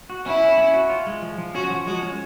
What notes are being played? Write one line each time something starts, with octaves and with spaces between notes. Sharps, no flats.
F#4
C#4 E4
C#4
C#4
F#4
F4
G#3
F3
F3
C#4 F#4
F3
G#3 F#4
C#4